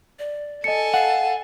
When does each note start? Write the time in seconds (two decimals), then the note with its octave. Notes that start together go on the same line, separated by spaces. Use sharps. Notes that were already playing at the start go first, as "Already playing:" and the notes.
0.19 D5
0.64 A4 D#5 G#5 A5 C#7
0.94 F5 F#5